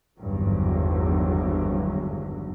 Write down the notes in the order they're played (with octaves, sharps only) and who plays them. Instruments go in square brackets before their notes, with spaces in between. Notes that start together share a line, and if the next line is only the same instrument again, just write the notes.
[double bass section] G#1 E2 G2 D3 F#3